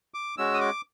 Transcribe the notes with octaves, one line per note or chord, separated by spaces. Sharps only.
D6
G#3 C#4 F#4 E6
D#6
D6